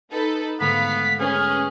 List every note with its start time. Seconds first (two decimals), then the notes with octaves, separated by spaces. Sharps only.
0.12 D#4 A4 B4
0.60 G#2 D3 A3 B3 F5 B6
1.20 B3 C#4 G#4 F6